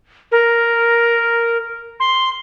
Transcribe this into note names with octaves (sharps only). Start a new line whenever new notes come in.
A#4
C6